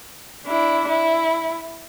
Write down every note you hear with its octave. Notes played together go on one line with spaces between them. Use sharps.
D4 E4
E4